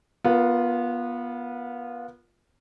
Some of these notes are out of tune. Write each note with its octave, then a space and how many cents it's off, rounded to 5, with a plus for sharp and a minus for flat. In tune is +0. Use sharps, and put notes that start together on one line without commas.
B3 -20 F4 +0 A#4 +5